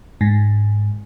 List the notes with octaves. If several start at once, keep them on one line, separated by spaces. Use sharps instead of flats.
G#2